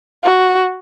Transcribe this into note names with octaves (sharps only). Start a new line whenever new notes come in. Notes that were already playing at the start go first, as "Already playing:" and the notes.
F#4